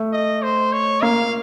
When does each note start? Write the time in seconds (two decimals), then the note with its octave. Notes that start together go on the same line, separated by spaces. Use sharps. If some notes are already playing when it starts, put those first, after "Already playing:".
Already playing: A3
0.13 D#5
0.43 C5
0.73 C#5
1.02 A#3 F5